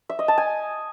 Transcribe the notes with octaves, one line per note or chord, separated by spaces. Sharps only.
E5
D#5
A5
G#5